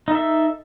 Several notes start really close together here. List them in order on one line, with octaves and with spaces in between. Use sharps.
D#4 A4 E5